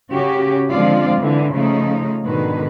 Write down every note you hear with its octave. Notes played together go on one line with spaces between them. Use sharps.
C#3 C#4 F#4 G4
D3 F3 G#3 C4 F4 D5
D3 E3
C#3 F3 A3 D#4
G#2 B2 D3 D#3 B4